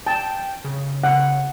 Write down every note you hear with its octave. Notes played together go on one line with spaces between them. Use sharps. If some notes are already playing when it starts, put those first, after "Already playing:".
G5 A5
C#3
C#3 F#5